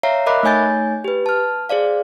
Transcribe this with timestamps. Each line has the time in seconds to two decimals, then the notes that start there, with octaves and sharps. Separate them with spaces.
0.03 C#5 E5 F5 A#5 C7
0.26 A#4 D#5 E5 B5 D6 F#6
0.43 A3 D#4 C#5 G#5 G6 A6
1.04 G4 B4
1.26 A5 F6
1.69 G#4 C5 D5 F5